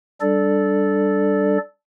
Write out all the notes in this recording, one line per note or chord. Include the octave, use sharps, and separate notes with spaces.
G3 D4 A4 D5